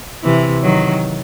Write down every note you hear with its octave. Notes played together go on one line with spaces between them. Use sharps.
C3 E3
D#3 F#3